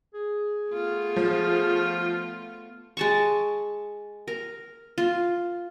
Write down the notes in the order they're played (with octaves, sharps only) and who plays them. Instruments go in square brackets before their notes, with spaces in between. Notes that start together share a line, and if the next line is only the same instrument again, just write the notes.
[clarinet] G#4
[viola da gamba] A3 B3 F4
[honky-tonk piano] F3
[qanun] G#3 A5 C#6
A#4
F4